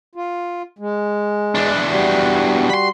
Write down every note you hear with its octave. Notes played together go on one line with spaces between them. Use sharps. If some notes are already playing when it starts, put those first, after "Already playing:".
F4
G#3
E2 D4
G3 F#4
B5 C6